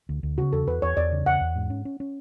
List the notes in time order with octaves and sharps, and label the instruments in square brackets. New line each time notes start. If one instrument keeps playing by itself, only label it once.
[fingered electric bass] D2
D2
[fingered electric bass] C#3 [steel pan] F#4
[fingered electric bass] E2 [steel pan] A4
[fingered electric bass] E2 [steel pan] B4
[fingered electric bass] E2 [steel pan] C#5
[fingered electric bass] E2 [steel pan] D5
[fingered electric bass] C#3
[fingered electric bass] E2 [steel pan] F#5
[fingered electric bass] E2
G#2
C#4
C#4
C#4